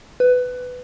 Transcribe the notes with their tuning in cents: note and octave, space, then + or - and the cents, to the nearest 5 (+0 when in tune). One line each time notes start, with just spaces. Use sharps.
B4 +15